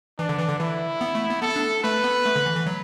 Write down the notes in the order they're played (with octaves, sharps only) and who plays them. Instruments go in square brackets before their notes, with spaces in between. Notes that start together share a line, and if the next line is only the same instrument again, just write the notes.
[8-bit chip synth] E3 [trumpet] D4
[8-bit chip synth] D3
E3
D3
[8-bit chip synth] E3 [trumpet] E4
[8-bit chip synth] B3
A3
B3
[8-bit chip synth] B3 [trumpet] A4
[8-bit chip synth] D4
[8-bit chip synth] A3 [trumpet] B4
[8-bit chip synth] B3
A3
D3
E3
E3
F#3